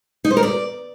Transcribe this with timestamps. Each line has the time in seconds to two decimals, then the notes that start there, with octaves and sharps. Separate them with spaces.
0.25 D#4
0.31 C5
0.37 A#4
0.43 D5